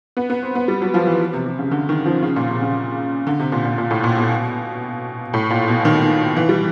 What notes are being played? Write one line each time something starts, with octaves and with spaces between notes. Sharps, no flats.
B3
B3
C4
B3
G3
F#3
F3
E3
C3
C3
C#3
D3
D#3
F3
C#3
A#2
C3
C#3
D3
C3
A#2
A#2
A#2
A2
A#2
B2
A2
A#2
B2
D#3
E3
G3